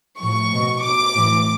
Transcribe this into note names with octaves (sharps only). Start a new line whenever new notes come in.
A2 F3 C#6
B2
B2 D6
A2 E3